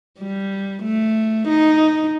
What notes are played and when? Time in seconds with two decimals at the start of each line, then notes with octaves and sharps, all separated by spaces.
0.20 G3
0.83 A3
1.48 D#4